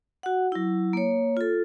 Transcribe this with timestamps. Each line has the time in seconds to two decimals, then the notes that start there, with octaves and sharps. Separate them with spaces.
0.23 F#4 F#5
0.52 F#3 E4
0.93 A#3 C#5
1.37 F4 A4